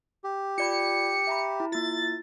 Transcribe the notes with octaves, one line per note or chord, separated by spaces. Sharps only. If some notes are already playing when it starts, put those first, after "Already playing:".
G4
F4 D5 B5 C#7
E5 A#5 B5
E4
A#3 E4 F4 A6